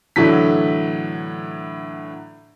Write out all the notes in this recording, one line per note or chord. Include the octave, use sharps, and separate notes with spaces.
A2 D3 E3 F#3 B6